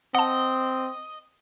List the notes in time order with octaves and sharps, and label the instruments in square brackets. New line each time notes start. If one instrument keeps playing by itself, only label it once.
[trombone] C4 [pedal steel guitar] D#5 [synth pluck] F#5 A5